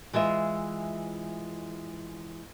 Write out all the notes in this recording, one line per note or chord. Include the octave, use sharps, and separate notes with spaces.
E3 G#3 F4 E5